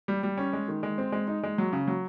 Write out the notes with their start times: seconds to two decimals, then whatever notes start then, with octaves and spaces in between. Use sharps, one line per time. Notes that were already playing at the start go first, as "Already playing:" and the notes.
0.08 G3
0.23 G3
0.38 C#4
0.53 G#3
0.68 D#3
0.83 G#3
0.98 C4
1.12 G#3
1.28 D#4
1.43 G#3
1.58 F#3
1.73 C#3
1.87 F#3